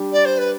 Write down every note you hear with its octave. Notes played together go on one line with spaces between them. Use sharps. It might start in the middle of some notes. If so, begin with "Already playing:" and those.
Already playing: G3 D4 G4
D5
C5
B4